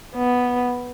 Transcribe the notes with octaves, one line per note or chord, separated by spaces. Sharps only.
B3